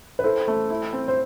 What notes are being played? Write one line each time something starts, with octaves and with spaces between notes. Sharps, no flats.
B4
E4 A4 C5
A3
E4
C4
C5